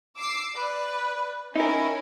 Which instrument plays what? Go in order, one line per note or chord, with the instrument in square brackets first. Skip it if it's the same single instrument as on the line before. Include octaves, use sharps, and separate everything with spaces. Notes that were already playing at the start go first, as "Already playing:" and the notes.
[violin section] D6 E6 C7
[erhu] B4 [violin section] D5
[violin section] C#4 G#5 [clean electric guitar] D#4 A#4 [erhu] E4